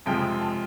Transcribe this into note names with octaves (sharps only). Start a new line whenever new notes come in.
F2 C3 F3 G#3 G5
A5